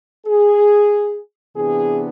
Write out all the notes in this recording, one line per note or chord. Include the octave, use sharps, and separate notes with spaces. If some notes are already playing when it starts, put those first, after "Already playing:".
G#4
C3 E3 B3 D4 G#4